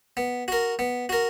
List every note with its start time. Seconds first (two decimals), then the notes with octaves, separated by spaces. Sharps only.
0.17 B3
0.48 F#4 A#4
0.79 B3
1.09 F#4 A#4